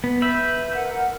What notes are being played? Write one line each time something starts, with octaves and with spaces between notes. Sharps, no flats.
B3
B4 E5 B5 G6
A#4 F#5